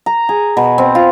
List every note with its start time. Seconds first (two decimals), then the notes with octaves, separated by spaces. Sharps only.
0.06 A#5
0.29 G#4
0.57 B2
0.78 C4
0.95 F4